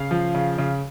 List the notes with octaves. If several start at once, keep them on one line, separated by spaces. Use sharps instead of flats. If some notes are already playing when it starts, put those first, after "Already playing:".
Already playing: C#3 F5
F3
C#3
C#3